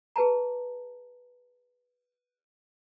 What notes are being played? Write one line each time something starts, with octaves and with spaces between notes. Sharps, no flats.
G#4 B4 A5 A#5